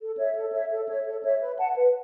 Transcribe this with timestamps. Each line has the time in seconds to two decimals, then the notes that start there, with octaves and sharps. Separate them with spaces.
0.01 A4
0.18 C#5 E5
0.35 A4
0.52 C#5 E5
0.71 A4
0.88 C#5 E5
1.05 A4
1.24 C#5 E5
1.41 B4
1.58 F#5 A5
1.76 B4